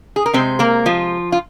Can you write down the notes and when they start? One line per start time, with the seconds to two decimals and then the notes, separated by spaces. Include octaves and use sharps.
0.16 G#4
0.26 A#4
0.33 C3 G#3 C4 C5
0.59 A#3 A#4
0.86 F3 F4
1.32 F4